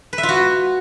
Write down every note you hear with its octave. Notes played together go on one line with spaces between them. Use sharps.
B4
E5
F4
F#4